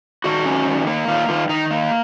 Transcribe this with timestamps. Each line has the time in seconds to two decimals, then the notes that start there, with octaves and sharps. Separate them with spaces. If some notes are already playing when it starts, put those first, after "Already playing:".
0.24 D#3 F#4
0.46 C#4
0.67 D#3
0.87 A#3
1.08 D#3 F4
1.29 D#3 F4
1.49 D#3 D#4
1.71 A#3